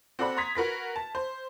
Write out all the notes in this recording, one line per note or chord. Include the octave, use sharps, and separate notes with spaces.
C4 F#4 A4 D5 F#5 B5
A#5 C6 D#6 G#6 B6
F#4 A#4 B4 B6
A5
C5